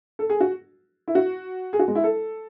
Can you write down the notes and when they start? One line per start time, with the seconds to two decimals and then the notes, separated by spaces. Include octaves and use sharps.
0.19 A4
0.30 G#4
0.40 F#4
1.08 E4
1.15 F#4
1.73 G#4
1.79 F#4
1.88 G#3
1.95 E4
2.04 A4